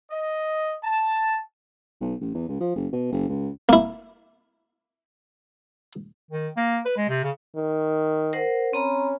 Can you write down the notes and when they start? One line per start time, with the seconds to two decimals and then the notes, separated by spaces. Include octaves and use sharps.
0.11 D#5
0.84 A5
2.01 B1
2.21 A1
2.34 E2
2.48 C#2
2.60 F3
2.76 F#1
2.92 B2
3.12 F#1
3.29 C#2
3.69 A#3 E4
6.31 D#3
6.57 A#3
6.85 B4
6.97 G#3
7.09 C3
7.24 C#3
7.56 D#3
8.33 A#4 C5 F#5
8.73 C4 C#4 A#5 B5